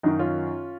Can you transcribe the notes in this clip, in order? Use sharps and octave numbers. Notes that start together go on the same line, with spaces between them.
F#2 D#3 D#4
C#4 F4